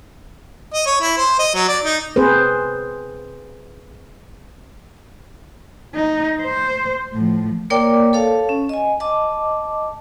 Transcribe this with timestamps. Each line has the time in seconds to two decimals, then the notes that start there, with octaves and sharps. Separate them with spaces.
0.74 D#5
0.86 C#5
1.01 E4
1.17 C5
1.39 D#5
1.54 F#3
1.68 D5
1.84 D#4
2.16 C4 G#4 B4 C5
5.95 D#4
6.42 C5
7.13 A2 F3
7.70 A#3 A#4 C#5 D5 G5 D6
8.13 A4 C#5 F5 A5
8.49 C#4
8.69 D#5 G#5
9.00 D#5 A5 D6